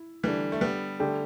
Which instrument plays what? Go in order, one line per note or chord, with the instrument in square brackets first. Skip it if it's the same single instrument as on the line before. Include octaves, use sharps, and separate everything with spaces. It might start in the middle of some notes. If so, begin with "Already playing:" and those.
Already playing: [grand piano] E4
[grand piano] D3 A3 D4 [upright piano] E3 G3
[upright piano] A3
G3 B3
[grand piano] D3 A3 D4 G4